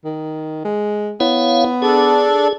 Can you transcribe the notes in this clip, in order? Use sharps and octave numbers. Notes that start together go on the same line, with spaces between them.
D#3
G#3
B3 E4 C#5 F5
D4 G#4 A4 D5